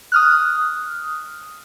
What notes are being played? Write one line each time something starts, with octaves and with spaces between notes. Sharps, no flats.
D#6 F6 F#6